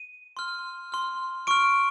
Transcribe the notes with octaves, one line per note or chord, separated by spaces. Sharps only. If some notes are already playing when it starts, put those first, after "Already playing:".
Already playing: D#7
C6 F6
C6 F6
C#6 F6 D7